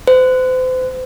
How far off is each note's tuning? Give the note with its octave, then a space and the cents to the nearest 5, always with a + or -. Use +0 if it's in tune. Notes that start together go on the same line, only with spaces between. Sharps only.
C5 -40